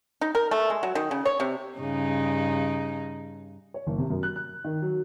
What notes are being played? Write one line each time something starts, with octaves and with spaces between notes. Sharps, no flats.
D#4
A#4
A3
G#3
F#3
D#3
C#3
C#5
C3
G2 C#3 D#4
C#5
F#1
C3
F#2
F#6
F#6
D#3
F#3